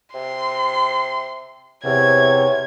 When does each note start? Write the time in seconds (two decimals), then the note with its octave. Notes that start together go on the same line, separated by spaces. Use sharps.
0.14 C3 C6
1.85 E2 C3 C#5 G#6